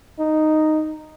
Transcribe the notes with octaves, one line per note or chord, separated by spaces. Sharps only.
D#4